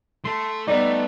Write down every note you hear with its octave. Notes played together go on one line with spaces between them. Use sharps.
A3 A4 C6
G3 A3 B3 D#4 D5